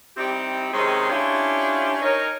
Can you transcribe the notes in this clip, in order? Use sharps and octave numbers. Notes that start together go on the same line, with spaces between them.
G3 C4 D#4 E4 G4
C3 D#3 G#3 C#4 G#4 C5
C#4 D4 E4 F4 G4 C#5
D#4 A#4 C#5